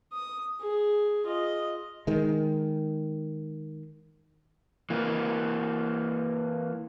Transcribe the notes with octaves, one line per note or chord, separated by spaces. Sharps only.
D#6
G#4
F4 D#5
D#3 G#3
E3 A#3